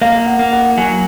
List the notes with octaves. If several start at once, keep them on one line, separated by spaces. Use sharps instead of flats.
A#3 F5
F#5
A#3
F#5
F#3 G#5